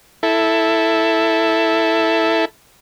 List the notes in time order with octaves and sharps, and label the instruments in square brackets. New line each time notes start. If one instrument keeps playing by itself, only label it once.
[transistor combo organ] E4 A4